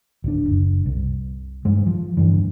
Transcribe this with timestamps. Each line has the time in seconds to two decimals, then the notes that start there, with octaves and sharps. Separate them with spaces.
0.24 D1 D4
0.49 F#1
0.86 C2
1.65 G2 G#3
1.87 F3
2.17 D2 G2 E3